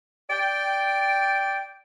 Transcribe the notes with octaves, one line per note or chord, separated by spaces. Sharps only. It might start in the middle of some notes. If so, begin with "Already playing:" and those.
D5 G5